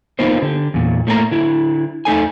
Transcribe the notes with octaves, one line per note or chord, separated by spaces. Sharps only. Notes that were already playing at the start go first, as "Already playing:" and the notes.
A#3 B3 D#4 F4 C5
D3 G4
E2 A#2
A2 A3 A#3 A#4 A#5
D3 E4
A3 D#4 A4 G#5